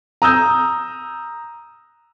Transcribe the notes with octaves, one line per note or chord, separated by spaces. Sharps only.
A#5 D#6 E6 G6